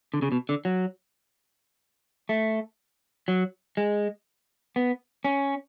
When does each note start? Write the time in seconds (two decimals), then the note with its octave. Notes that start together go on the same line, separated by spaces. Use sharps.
0.14 D3
0.22 C#3
0.32 B2
0.49 D3
0.65 F#3
2.29 A3
3.28 F#3
3.77 G#3
4.76 B3
5.25 C#4